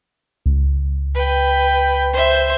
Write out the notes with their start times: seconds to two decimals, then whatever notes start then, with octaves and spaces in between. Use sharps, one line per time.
0.45 C#2
1.15 B4 G5
2.13 C5 E5